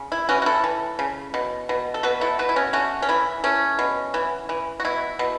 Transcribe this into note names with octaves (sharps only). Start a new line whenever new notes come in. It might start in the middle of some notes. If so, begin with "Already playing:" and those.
Already playing: C#3
E4
E3 C#4 F#4
F#4
E4 A4
E3
C#3
B2
B2
A4
B2 F#4 B4
E4 A4
B2 F#4 B4
E4
C#4 F#4
A3 C#4 F#4
C#4
E3 E4
A3 C#4
B2
E3
E3
F#4
B2 E4
B2